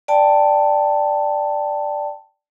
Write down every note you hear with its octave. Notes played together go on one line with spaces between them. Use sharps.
D5 G5 A5